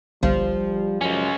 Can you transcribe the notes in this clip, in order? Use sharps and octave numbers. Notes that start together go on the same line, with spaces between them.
G1 C2 F3 G3
F#2 G#3 C#4